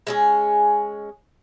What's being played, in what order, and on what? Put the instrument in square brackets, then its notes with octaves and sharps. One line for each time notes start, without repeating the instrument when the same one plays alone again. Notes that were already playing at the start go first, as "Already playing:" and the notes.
[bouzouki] G#3 C#4 G#4